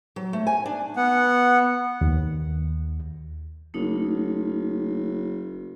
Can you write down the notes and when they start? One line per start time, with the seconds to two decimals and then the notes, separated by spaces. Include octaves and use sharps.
0.16 F#3
0.33 A3
0.47 G#5
0.66 D4
0.96 B3 F#5
2.01 D#2
3.74 F#1 A3 D4 D#4